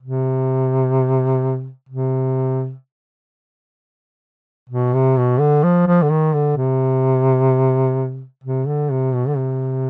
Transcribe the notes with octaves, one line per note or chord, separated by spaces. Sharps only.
C3
C3
B2
C3
B2
D3
F3
F3
D3
D#3
D3
C3
C3
D3
C3
B2
D3
C3